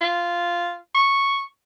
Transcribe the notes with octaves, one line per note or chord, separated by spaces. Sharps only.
F4
C#6